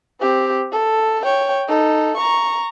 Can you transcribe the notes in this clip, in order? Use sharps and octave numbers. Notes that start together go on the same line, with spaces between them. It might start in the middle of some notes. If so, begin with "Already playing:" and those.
C4 G4
A4
C#5 G5
D#4 A4
A#5 C#6